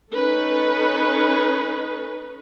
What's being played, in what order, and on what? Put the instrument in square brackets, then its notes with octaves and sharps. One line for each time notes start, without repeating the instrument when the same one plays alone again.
[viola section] C#4 D#4 A4 B4